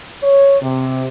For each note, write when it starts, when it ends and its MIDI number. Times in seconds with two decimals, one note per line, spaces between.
0.22 0.56 73
0.62 1.07 48